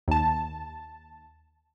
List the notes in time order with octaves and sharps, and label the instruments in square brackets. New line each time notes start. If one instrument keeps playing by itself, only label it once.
[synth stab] D#2 A5